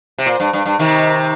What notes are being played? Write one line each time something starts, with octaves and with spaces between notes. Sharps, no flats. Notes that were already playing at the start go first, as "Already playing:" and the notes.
C3
A#2
G2
G2
G2
C3 D#3